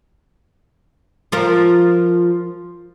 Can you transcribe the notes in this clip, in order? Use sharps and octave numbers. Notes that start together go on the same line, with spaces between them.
F3 F4 A#4